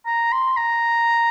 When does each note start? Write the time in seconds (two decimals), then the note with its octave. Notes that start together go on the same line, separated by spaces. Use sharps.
0.06 A#5
0.33 C6
0.57 A#5